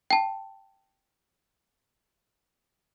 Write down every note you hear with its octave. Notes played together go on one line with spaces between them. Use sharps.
G5 A5